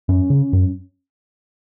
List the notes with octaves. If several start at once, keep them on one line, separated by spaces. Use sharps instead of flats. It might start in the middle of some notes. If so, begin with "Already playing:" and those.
F#2 C#4
C#3
F#2